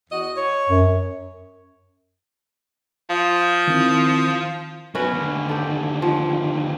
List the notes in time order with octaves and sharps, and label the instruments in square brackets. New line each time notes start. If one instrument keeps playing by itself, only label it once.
[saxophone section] E2 F#4 D#5
C#5
[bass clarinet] F#2
[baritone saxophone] F3 [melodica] F5 D#6
[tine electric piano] D#3 C4 E4
[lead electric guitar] F#3 B3 [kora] C#4 F#4 B4
[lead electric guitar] D#2 D3
[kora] G4 A4
F3